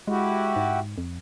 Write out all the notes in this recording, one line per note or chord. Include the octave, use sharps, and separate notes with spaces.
G#3 E4 F#4 G4
G#2
F2